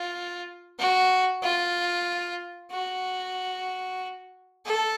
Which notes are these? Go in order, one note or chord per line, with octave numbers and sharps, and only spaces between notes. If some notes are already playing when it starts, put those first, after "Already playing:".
Already playing: F4
F#4
F4
F#4
A4